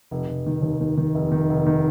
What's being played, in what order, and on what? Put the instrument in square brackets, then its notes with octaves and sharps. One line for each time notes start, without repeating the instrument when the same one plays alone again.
[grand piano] F1
F1
D#3
D#2
D#3
D#3
F1
D#3
F1
D#3